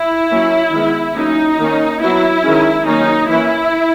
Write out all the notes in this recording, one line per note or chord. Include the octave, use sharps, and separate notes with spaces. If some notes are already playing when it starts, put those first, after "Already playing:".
Already playing: E4
F#3 A#3 C#4
D#3 G#3 B3
F#3 A#3 C#4 D#4
D#3 A#3 C#4
F#3 B3 E4
D#3 G#3 C#4
D#3 F#3 A#3 C#4 D#4
E3 A#3 C#4 E4